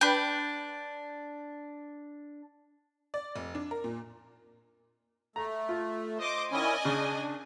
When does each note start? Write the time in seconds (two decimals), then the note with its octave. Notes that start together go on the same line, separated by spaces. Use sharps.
0.01 D4 B4 G5
3.14 D5
3.36 F1
3.55 D4
3.71 A#4
3.84 A#2
5.36 A3 A#5
5.69 F4
6.18 C5 D#5 D6
6.52 D#3 C#4 E4 D5 D#5 G#5
6.85 C#3 D4